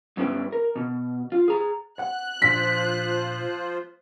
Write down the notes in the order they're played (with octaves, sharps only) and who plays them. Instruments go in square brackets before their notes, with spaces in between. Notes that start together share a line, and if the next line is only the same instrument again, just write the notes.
[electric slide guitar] G2 B3 C#4 E4 B4 G5
A#4
B2
F4
G#4 A#5
[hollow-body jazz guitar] F#5 [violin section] F#6
[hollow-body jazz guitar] A#2 D4 [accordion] F3 F4 C5 [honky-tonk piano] B6